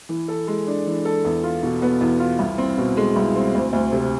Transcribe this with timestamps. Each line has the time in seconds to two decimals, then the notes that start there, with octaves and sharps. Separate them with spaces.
0.09 E3
0.28 A4
0.47 G#3
0.67 D4
0.87 E3
1.05 A4
1.25 E2
1.43 F4
1.63 B2
1.82 B3
2.01 E2
2.20 F4
2.39 C2
2.58 C4
2.78 B2
2.97 G#3
3.16 C2
3.36 C4
3.55 D2
3.73 D2
3.92 C3